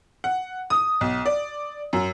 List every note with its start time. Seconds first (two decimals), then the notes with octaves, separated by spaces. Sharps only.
0.24 F#5
0.70 D#6
1.01 B1
1.26 D5
1.93 F#2